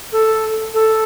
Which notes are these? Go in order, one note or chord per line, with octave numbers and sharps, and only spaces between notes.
A4
A4